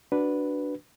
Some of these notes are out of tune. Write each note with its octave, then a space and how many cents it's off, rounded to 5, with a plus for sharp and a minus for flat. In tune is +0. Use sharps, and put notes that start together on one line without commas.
D4 +0 F#4 +0 B4 +0